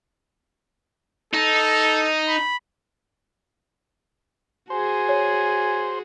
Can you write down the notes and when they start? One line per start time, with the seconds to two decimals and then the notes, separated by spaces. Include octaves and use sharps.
1.33 D#4 A4
2.28 B5
4.70 F#4 G#4 C5 G#5
5.09 C#5